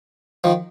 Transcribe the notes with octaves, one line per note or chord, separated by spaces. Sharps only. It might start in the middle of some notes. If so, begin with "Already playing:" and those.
D#3 F3